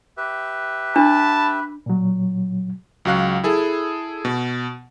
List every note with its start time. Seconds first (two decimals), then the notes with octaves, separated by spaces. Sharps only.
0.17 G4 B4 E5
0.96 D4 A5 B5
1.86 A#2 F#3
3.05 C#2 F#3 F#4 F5 F#6
3.44 E4 G#4 A4
4.25 B2